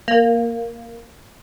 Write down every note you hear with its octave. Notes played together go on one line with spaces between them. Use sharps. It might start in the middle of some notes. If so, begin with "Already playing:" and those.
A#3